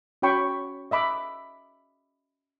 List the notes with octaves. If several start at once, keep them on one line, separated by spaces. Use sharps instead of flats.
C#4 F#4 C#5 G5 B5 C#6
D#5 E5 B5 D6